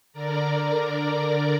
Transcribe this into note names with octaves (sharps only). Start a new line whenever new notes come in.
D3 A#4 D5 A#5